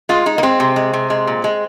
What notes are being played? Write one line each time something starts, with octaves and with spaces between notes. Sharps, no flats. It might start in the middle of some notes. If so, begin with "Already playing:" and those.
G#3 F4
G#3 D#4
A#3
G#3 C4
C3
G#3
C3
G#3
A#2
G#3